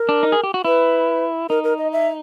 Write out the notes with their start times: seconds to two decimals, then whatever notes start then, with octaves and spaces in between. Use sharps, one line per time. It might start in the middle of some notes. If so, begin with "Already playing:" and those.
Already playing: A#4
0.09 D4
0.23 D#4
0.32 G#4
0.44 G4
0.54 F#4
0.65 E4 B4
1.49 D#4 A#4
1.64 A#4
1.78 D#5
1.92 E5